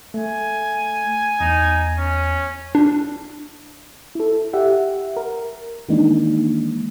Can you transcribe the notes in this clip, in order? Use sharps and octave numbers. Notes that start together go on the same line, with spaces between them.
A3 G#5
E2 D#4
C#4
D4
E4 A4
G4 E5 F#5
A#4
D#3 E3 G#3 A#3 D4 D#4